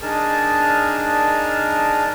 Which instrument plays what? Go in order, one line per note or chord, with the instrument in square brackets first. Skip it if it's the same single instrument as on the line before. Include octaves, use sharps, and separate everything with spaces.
[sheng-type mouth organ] D4 D#4 G#4 A#4 A5